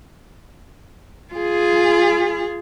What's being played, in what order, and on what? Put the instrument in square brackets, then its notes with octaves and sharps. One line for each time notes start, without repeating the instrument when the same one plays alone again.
[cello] F4 G#4